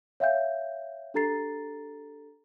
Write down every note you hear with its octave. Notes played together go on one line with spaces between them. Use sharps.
C#5 E5 F5 G5 G6
D4 G4 A4 A#5 A6 C7